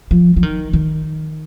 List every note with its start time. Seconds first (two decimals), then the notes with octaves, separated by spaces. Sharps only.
0.11 F3
0.37 F3
0.43 D#3
0.73 D#3